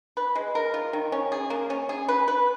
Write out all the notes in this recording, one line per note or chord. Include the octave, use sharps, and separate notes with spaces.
B4
G#3
A#4
F4
D#3
C#4
G#4
A#3
C#4
G#4
B4
B4